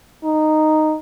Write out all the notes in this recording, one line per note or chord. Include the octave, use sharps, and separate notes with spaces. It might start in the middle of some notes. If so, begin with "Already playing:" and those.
D#4